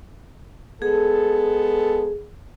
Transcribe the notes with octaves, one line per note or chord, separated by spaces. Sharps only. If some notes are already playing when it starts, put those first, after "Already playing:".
G#3 B3 G#4 A4